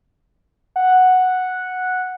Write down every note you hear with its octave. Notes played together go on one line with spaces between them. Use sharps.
F#5